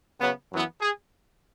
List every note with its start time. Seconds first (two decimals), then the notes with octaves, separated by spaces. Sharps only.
0.20 C#3 F#3 B3
0.51 F#2 E3 B3
0.81 G#4